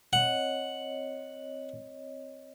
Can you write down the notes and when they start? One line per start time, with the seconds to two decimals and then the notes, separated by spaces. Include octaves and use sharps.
0.13 C4 C#5 D#5 F#5